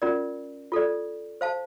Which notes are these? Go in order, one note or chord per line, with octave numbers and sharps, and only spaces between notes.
C#4 F4 A#4 D5
F4 A4 D5
C5 F5 A5